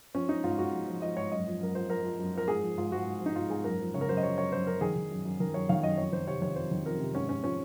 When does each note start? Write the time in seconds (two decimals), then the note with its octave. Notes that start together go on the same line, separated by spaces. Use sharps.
0.15 F3 C#4
0.29 F3 D#4
0.44 G#2 F4
0.59 G#2 F#4
0.73 F3
0.87 F3
1.02 F3 D#5
1.17 G#2 C#5
1.32 F#2 D#5
1.46 F3
1.60 F#2 A#4
1.75 F3 C5
1.89 F3 A#4
2.04 F3
2.19 F#2
2.34 F3 A#4
2.48 G#2 G#4
2.62 F3
2.78 G#2 F4
2.92 G#2 F#4
3.07 G#2
3.21 F3
3.26 D#4
3.36 G#2 F4
3.50 G#2 G#4
3.64 F#2 A#4
3.80 F3
3.94 C#3 C#5
4.01 A#4
4.09 F#2 C5
4.17 D#5
4.23 F3 C#5
4.38 F#2 C#5
4.52 F#2 C5
4.67 F#2 A#4
4.81 D#3 G#4
4.96 D#3
5.10 F#2
5.25 F#2
5.40 D#3 A#4
5.54 F#2 C#5
5.69 D#3 F5
5.83 F#2 D#5
5.98 F2 C#5
6.12 D#3 C5
6.27 C3 C#5
6.42 D#3 C#5
6.56 F2 C5
6.71 D#3
6.86 F2 A#4
7.00 C3
7.15 G#2 C#4
7.29 G#2 C#4
7.44 F3 C#4